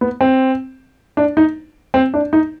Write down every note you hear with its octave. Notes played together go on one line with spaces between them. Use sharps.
B3
C4
D4
D#4
C4
D4
D#4